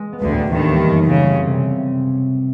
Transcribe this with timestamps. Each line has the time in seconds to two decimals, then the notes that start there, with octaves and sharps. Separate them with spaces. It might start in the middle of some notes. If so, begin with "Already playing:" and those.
Already playing: G#3
0.13 B3
0.21 D2 D3
0.32 A2
0.50 D#2 D#3 E3
0.70 G3
0.89 F#2
1.08 C#3 G3
1.28 C4
1.47 C3